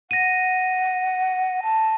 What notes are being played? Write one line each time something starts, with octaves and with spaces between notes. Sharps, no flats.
F#5 A#6 D#7
A5